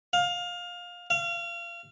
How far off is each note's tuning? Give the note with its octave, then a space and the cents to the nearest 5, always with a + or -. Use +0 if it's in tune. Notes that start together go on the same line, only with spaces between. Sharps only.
F5 +20
F5 -30